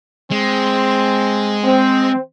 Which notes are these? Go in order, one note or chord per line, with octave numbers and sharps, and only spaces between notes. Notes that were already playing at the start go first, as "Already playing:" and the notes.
G#3 C4
C4